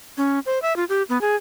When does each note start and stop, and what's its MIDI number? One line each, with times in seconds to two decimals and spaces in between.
0.17 0.39 61
0.46 0.59 72
0.62 0.75 76
0.76 0.84 65
0.89 1.03 67
1.09 1.21 59
1.21 1.36 68